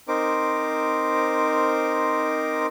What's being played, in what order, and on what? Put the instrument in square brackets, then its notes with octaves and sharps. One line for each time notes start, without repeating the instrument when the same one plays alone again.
[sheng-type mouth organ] C4 D#4 A#4 C5 D6